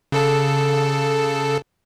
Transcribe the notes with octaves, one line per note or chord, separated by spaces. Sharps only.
C#3 A4 A5